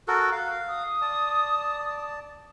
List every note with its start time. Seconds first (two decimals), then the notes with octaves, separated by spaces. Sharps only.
0.08 F#4 A4 A#4 F#6
0.32 F5
0.68 D#6
1.01 D5 A5